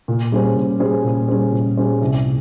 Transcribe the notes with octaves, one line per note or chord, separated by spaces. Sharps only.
A#2
G3 C#4 G#4 C5
A#2
G3 C#4 G#4 C5
A#2
G3 C#4 G#4 C5
A#2
G3 C#4 G#4 C5
C2
A#2